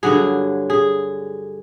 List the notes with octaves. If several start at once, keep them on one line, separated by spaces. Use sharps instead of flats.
G2 D3 F#3 G#4
G#4